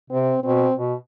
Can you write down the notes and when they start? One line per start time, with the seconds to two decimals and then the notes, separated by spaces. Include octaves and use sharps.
0.10 C3 C4
0.44 B2 C4
0.78 B2